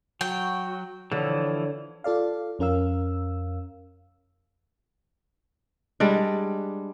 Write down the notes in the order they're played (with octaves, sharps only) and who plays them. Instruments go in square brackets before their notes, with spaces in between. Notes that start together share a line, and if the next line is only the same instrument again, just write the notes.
[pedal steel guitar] F#3 [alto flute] F#4 [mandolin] G5
[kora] D3 [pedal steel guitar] E3 F3 [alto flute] C#5
[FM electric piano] F4 A4 D5 F5
F2 C#4 A#4 F5 E6
[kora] G3 G#3 D4